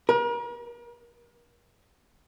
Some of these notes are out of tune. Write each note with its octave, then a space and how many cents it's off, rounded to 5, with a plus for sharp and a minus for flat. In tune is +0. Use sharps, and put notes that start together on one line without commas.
A#4 +40